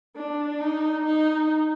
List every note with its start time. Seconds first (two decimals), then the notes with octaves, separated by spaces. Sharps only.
0.16 D4
0.61 D#4
1.05 D#4